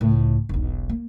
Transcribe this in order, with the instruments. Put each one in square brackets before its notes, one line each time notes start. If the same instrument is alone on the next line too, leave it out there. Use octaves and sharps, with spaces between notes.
[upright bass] C#2 A2
E1 B1
A#3